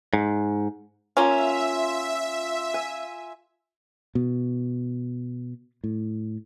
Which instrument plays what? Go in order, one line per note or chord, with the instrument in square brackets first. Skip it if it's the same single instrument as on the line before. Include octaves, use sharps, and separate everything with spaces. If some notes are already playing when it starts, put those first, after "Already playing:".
[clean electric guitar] G#2
[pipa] A#3 C#4 [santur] F4 [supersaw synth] E5
[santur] G#5
[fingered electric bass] B2
A2